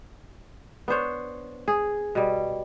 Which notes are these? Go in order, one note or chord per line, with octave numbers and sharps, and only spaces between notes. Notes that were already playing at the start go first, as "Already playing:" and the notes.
B3 D4 C5 C#5
G#4
B2 G3